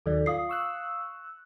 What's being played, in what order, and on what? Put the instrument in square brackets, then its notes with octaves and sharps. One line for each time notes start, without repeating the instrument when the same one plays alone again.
[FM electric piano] D#2 D#3 F#3 [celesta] A4 D5
[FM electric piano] F4 [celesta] F5 D#6 C7
[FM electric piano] C#6 E6 F#6